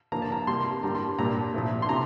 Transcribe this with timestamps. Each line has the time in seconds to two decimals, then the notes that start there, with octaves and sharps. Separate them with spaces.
0.12 D3 F3 A#3 A#5
0.22 A5
0.32 A#5
0.47 C3 G3 A#3 C6
0.83 D3 G3 A#3 A#5
0.95 C6
1.19 A#2 G3 A#3 A#5
1.54 A#2 F3 A3
1.82 C6
1.89 C3 A#5